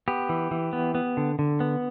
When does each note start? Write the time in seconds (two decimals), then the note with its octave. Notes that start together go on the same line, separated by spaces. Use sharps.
0.08 B3 G4
0.29 E3
0.51 E3
0.73 B3
0.95 B3
1.17 D3
1.39 D3
1.60 B3